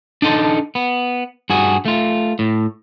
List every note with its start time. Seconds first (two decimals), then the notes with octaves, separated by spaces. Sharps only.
0.22 D4 D#4 A4 C6
0.75 B3
1.50 G2 F#4 G#4
1.86 A3 F4
2.39 A2